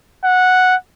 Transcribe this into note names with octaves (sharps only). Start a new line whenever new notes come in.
F#5